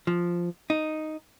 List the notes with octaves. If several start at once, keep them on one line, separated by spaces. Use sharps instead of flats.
F3
D#4